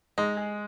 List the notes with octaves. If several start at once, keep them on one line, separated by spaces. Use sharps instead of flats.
G#3 D#4
G#4